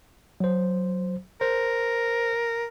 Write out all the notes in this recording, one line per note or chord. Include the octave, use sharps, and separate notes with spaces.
F#3 C5
A#4 C5